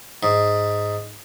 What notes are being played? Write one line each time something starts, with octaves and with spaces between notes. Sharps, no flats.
G#2